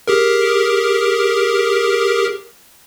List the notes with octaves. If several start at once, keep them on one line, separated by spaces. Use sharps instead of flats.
G4 G#4 A#4